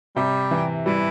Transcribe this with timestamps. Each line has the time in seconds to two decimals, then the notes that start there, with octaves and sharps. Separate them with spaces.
0.16 C3 G3
0.51 E3
0.86 E3 G3